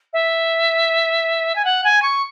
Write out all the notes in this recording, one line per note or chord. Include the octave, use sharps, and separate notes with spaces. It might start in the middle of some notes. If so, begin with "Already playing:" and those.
E5
G#5
F#5
G#5
C#6